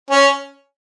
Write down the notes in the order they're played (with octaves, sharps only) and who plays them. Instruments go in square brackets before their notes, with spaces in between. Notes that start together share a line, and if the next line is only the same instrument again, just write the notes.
[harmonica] C#4